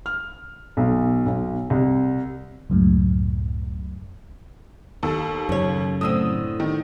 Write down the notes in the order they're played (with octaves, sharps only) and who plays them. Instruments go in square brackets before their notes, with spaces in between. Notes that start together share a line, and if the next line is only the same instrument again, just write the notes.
[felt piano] F6
B1
B1
C2
[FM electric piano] C#2 F#2 A2
[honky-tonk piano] D#2 A4 E6
[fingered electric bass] F#2 C#3 [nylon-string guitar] C#4 C#5
[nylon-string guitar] A2 D3 C4 [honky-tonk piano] D#6 E6 D#7
[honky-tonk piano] D#3